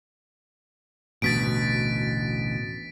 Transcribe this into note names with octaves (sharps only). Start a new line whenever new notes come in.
A1 D2 B2 A6 B6 D7